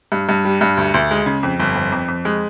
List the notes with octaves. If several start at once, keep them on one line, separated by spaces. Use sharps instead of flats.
G2
G2
G3
G2
D2
D2
G#3
C#3
F2
G1
F2
F2
F2
G#3